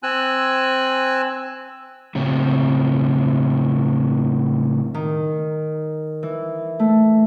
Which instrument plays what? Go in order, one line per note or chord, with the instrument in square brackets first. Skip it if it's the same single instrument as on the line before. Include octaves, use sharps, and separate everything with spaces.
[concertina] C4 G#5 E6 F#6
[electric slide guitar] A2 C#3 C4
[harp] D#3
E3
A3